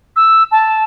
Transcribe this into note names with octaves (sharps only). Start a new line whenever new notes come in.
E6
A5